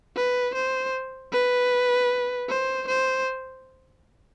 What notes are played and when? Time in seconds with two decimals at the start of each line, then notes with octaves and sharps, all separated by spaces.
0.16 B4
0.55 C5
1.32 B4
2.49 C5
2.88 C5